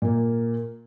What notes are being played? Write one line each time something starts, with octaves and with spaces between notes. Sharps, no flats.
A#2 A#3